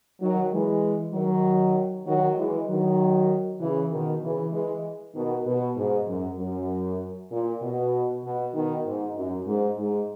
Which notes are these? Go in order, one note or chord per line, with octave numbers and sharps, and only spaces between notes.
D#3 F#3
E3 G#3
D#3 F#3
D#3 F#3
E3 G#3
D#3 F#3
C#3 E3
B2 D#3
C#3 E3
E3 G#3
B2 D#3
B2
G#2
F#2
F#2
A#2
B2
B2
B2 D#3
G#2
F#2
G#2
G#2